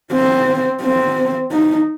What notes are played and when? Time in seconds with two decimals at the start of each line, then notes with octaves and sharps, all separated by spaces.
0.13 C4
0.82 C4
1.51 D#4